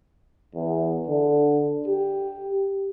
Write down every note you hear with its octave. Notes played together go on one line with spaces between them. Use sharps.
E2
D3
G4